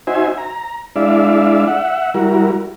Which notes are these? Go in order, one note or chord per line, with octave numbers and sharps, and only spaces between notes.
D#4 F#4 C5 E5 G#5
A#5
G#3 D4 E4 D5 E5 F5
E5 F#5
G3 E4 F#4 A#4